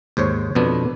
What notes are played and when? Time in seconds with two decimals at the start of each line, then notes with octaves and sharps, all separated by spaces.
0.17 D#2 G#2 C5 C#5
0.55 F2 B2 B3 D4